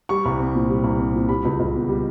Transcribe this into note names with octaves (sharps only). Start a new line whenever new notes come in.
G3 C#6
C2
C4
A#2
G3
C2
C4
A#2
G3 B5
C#2
C#2
B2
G3